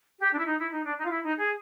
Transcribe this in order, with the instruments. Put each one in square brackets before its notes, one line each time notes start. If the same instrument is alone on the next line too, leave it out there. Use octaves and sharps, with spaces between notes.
[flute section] G4
D4
E4
D#4
E4
D#4
D4
D#4
F4
E4
D#4
G#4